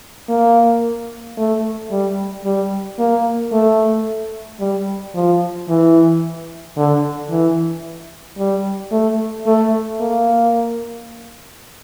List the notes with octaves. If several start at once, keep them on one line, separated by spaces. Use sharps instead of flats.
A#3
A3
G3
G3
A#3
A3
G3
F3
E3
D3
E3
G3
A3
A3
A#3